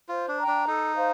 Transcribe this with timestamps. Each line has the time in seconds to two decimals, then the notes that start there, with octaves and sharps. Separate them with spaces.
0.08 F4 C5
0.28 D4
0.39 G5 A#5
0.48 D4
0.67 D#4 A4
0.96 C5 F5